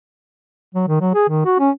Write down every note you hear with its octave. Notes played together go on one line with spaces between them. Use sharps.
F#3
D#3
F#3
G#4
D#3
F#4
C#4